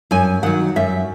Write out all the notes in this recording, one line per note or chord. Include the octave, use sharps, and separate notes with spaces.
F#2 G#5
D#3 F#3 F#5
F#2 E5